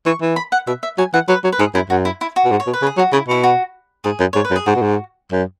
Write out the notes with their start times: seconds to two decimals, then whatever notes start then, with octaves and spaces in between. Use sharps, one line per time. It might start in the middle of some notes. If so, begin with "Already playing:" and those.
0.06 E3 C#6
0.21 E3
0.36 B5
0.52 F#5
0.67 B2 E5
0.83 E5
0.98 F#3 G#5
1.14 E3 F#5
1.28 F#3 B4
1.44 F#3
1.52 B4
1.59 G#2 G#4
1.74 F#2 E4
1.90 F#2 F#4
2.05 E4
2.21 E4
2.36 F#4
2.45 B2
2.51 G#2
2.60 C#5
2.66 B2
2.73 B4
2.82 C#3
2.87 G#4
2.97 F#3 F#4
3.12 C#3 E4
3.28 B2 E4
3.44 F#4
4.04 G#2 G#4
4.20 F#2
4.33 G#2 C#5
4.45 B4
4.51 F#2
4.56 G#4
4.66 G#2 F#4
4.76 B2
4.81 G#2
5.32 F#2